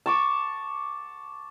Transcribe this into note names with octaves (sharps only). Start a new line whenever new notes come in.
A5 C#6 D6